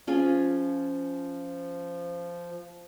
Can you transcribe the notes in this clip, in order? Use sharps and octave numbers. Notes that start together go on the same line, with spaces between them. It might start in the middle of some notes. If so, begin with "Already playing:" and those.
F3 C#4 F4 G#4